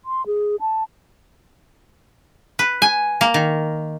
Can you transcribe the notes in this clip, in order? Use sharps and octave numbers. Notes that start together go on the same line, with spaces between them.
C6
G#4
A5
B4
G#5
A#3
D#3